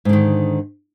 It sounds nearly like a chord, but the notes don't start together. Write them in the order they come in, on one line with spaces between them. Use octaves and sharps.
G#2 D3 D#3